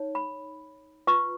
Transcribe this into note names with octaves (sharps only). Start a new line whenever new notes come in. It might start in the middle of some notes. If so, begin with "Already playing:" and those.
Already playing: D#4 C#5
B5
F4 B4 C#6